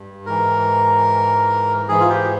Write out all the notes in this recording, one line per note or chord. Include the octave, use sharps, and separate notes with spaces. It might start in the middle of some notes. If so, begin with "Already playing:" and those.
Already playing: G2
G#2 E3 A#4
G#2 E3 G#4
F4
G4